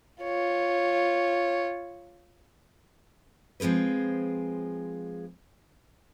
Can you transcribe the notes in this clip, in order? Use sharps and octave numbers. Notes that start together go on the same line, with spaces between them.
F4 C#5
F3 G#3 C4 G#4 B4